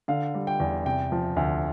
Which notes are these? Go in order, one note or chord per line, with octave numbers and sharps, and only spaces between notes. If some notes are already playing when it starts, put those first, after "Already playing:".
D3 F5
G3
G5
E2
C3 G5
F3
D2